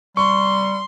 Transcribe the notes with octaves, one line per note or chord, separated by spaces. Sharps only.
G3 C6 C#6